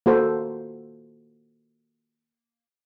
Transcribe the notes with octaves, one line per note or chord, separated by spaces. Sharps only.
A#3 F#4 A4 C5